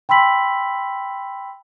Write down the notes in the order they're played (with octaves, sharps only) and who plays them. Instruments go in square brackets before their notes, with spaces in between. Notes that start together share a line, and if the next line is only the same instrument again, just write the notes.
[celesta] G5 B5 C6 E6 B6 F#7